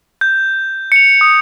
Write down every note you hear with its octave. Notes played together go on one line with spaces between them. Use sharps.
G6
C#7 F7
D#6